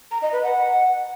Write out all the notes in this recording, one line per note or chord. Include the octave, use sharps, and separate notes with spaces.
A#5
D#5
B4
F#5